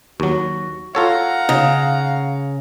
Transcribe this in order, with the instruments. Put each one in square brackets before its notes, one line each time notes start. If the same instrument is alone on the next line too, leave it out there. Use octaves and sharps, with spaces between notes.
[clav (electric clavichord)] D#2 F#3 [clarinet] F#4
[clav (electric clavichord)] F4 A4 C#5 [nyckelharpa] F5 A#5 [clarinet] F#5
[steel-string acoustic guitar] C#3 [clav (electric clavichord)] D#4